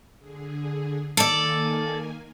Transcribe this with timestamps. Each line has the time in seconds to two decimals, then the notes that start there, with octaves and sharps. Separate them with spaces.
0.19 D3 G#4
1.17 D#3 A#3 A4 D5 G#5